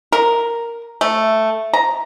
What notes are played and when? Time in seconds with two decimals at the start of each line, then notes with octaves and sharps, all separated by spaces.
0.12 A#4
1.01 A3
1.74 A#5